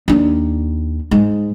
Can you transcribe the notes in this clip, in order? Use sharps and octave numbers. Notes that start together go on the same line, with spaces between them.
D#2 D4
G#2 G#3